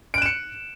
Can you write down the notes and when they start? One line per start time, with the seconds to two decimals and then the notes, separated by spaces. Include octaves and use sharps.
0.14 D7
0.18 F#6
0.22 E7
0.26 C#7